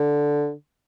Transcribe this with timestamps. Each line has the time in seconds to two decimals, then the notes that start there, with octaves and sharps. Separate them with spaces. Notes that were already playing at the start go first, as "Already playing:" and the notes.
Already playing: D3